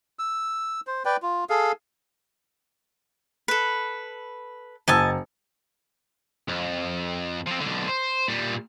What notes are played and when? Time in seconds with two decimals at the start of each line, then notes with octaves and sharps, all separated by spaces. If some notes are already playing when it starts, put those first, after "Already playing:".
0.19 E6
0.87 C5
1.05 B4 D5 G5
1.23 F4
1.50 G#4 A4 F5
3.48 A4 B4
4.88 F#1 D#5 G#5 A5 E6
6.49 F2
7.46 F3 C4
7.61 B1 D3
7.88 C5
8.28 A#2 G3